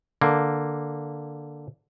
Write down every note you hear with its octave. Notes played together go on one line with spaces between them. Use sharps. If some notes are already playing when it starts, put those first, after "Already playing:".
D3 A#3